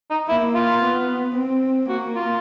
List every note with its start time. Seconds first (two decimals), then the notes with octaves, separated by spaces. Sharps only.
0.10 D#4
0.28 A#3 E4
0.55 F4
0.82 B3
1.35 C4
1.89 A#3 F#4
2.16 F4